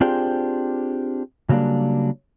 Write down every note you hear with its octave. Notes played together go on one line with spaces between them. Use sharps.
C4 D4 F4 G4 G#4 C5
C#3 F#3 G3 A#3 D4